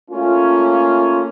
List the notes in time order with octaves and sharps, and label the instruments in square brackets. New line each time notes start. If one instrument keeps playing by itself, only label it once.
[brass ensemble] A3 A#3 C#4 F4